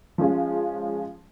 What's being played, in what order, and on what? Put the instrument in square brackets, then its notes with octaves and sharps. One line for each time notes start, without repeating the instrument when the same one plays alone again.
[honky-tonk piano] F3 G#3 C#4 F4